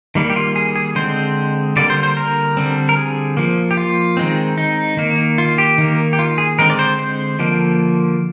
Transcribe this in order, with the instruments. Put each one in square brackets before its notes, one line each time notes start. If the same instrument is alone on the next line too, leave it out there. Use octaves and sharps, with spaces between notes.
[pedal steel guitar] D#3 G3 A#3
G4
F4
G#4
G#4
D3 G#3 C4 C5
D3 G3 A#3 D5
C5
C5
A#4
D3 G3 C4
A#4
G#4
F3 A#3
G4
F4
D#3 G#3 C4
D#4
D#3 A#3
F4
G4
D#3 A#3
G4
F4
G#4
D3 G#3 C4 A#4
D5
C5
C5
D3 F3 A#3